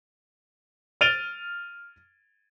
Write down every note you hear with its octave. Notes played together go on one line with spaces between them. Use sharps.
F6 A6 D7 D#7 F7 G7